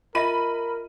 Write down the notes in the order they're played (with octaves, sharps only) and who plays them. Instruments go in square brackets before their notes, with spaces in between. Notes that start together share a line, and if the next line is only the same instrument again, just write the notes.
[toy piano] F4 D#5 E5 [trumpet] A#4 [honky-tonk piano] B5 D#7